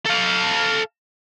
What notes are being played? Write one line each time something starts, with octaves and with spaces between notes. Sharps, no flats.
A4 F5